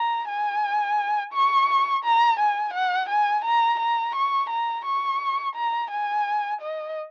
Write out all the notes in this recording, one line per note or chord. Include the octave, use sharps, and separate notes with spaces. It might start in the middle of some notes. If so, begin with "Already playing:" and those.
Already playing: A#5
G#5
C#6
A#5
G#5
F#5
G#5
A#5
A#5
C#6
A#5
C#6
A#5
G#5
D#5